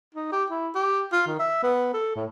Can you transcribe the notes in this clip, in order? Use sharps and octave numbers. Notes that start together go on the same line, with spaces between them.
D#4
G4
E4
G4
F4
D#3
E5
B3
A4
A2